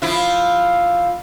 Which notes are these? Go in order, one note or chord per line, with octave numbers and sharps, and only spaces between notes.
F3 E4 F4